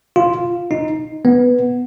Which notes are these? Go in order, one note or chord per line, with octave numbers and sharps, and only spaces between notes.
F4
D#4
B3